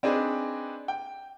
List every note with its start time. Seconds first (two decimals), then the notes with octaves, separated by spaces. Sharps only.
0.03 C4 D4 D#4 G#4 B4
0.88 G5